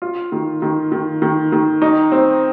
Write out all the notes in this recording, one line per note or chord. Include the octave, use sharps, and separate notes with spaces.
F4
D#3
D#3
D#3
D#3
D#3
D#4
C4